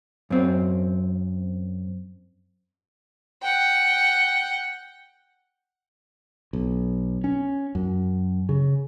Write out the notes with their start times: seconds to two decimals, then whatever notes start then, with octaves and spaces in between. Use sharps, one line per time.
0.30 F#2 C4
3.42 F#5 G5
6.53 B1
7.24 C#4
7.75 F#2
8.49 C#3